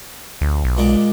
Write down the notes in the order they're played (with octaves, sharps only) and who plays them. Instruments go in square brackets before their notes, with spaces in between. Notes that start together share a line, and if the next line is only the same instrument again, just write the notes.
[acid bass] D2
B1
[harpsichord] A#2 G#3 D5